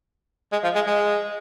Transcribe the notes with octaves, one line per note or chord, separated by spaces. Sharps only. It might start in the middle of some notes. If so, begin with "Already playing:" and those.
G#3
F3
G#3
G#3